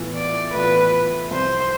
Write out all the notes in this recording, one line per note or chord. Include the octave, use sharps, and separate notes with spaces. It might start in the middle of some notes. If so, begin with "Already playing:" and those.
Already playing: A2 E3 B3 F4
D5
A2 E3 B3 F4 B4
C2 C3 F3 C4 C5